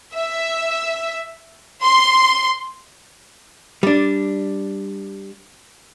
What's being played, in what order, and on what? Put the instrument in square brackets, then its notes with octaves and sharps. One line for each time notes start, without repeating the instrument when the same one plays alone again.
[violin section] E5
C6
[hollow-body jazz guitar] G3 D4